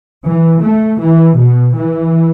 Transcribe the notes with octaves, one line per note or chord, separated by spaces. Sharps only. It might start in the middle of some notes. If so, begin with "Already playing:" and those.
E3
A3
E3
B2
E3